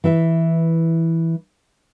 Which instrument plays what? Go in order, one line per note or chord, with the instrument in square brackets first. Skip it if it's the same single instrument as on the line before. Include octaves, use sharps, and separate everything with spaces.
[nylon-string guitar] E3 E4 E5